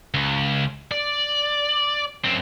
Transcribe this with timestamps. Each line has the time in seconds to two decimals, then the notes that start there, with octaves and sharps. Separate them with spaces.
0.14 C#2
0.91 D5
2.25 F#2 C4